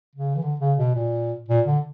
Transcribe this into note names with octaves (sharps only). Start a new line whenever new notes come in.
C#3
E3
D3
C#3
B2
A#2
A#2
D3